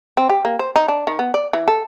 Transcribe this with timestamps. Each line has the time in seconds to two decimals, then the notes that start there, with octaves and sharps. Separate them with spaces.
0.17 C4
0.29 G4
0.45 A#3
0.59 C5
0.76 D#4
0.88 D4
1.07 D#3
1.19 B3
1.34 D5
1.53 E3
1.68 A4